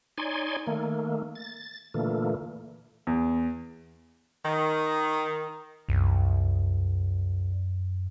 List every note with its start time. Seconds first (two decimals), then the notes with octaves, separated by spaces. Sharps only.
0.18 D#4 C#5 D5 G#5 C6
0.67 D#3 A3 A#3
1.35 A6
1.94 A#2 D3 E3 A3 A#3
3.07 E2
4.44 D#3
5.89 C2 F#2